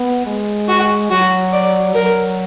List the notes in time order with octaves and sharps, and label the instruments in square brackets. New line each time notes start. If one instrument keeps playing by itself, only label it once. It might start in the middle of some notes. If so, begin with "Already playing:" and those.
Already playing: [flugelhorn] B3
G#3
[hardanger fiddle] F#4
[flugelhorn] F#3 [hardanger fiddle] F#4
[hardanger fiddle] D5
[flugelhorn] F#3 [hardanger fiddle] A#4